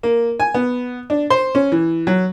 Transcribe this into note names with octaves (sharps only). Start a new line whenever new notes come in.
A#3
G#5
B3
D4
C5
C#4
E3
F#3